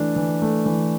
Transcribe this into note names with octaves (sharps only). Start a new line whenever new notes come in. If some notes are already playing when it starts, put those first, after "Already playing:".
Already playing: E3 A3 D4
E3
A3
E3